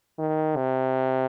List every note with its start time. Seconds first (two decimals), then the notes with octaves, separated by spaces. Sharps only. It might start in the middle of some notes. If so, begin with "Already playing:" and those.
0.19 D#3
0.57 C3